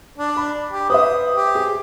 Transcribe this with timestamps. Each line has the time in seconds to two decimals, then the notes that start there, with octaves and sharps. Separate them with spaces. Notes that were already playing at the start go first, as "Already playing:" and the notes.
0.18 D4
0.37 B5
0.72 G4
0.90 B4 C5 E5 D#6
1.34 G4
1.55 G#4